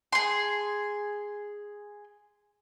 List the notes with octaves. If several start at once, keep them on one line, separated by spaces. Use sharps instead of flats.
G#4 C6